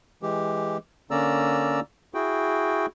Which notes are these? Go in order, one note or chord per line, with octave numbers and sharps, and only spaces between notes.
E3 G#3 G4
D3 A#3 C#4 D5 A#5 E6
E4 F#4 G#4 G5